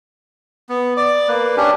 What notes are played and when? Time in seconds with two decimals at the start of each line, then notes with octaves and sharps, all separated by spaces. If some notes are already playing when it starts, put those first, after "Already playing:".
0.69 B3
0.97 D5 D6
1.28 A#3 B4
1.57 C#4 D4 G4